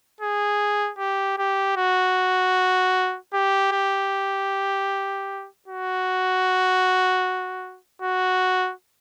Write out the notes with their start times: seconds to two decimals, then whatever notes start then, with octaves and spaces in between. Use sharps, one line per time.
0.21 G#4
0.99 G4
1.38 G4
1.77 F#4
3.34 G4
3.72 G4
5.68 F#4
8.02 F#4